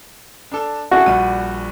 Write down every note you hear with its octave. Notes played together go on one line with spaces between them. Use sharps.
D4 A4
E4 F#4 G#4 A4
A#1 G3 D#7